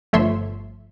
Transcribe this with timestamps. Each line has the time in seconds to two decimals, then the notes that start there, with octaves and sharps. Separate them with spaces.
0.13 G1 F3 A3 C#5 E5 C6